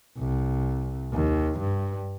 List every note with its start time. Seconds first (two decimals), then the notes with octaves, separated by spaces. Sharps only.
0.18 C2
1.13 D#2
1.60 G2